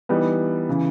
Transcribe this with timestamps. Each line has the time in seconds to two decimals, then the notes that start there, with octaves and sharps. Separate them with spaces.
0.09 E3 G3 B3 D#4
0.69 C#3 E3